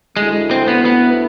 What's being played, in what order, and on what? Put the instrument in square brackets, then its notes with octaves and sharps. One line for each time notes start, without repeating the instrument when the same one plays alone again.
[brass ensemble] D2 D3 A3 E4 [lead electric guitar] G#3
[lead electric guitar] C4
B3
B3